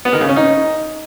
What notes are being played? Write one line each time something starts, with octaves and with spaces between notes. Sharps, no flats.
B3
D#3
C#3
C#4
D#4